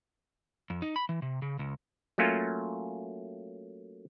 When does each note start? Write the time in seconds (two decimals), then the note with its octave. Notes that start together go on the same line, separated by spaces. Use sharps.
0.70 F2
0.82 D#4
0.96 B5
1.09 E3
1.22 C3
1.42 C#3
1.59 C#2
2.18 F#3 A3 A#3 C#4 F4